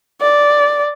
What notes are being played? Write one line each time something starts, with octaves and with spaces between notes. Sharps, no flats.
D5